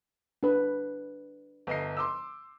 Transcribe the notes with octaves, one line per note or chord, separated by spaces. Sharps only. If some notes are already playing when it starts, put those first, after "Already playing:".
D4 B4
G1 D#5 C7
C6 D6 E6